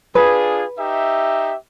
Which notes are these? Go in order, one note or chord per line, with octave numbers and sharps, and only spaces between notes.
D4 F4 G#4 B4
D#4 G4 E5